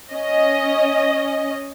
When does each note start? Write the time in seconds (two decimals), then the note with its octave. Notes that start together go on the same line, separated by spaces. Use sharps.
0.12 C#4 D#5